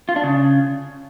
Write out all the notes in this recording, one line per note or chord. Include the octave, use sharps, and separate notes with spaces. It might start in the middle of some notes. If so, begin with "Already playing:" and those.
F4
D4
C#3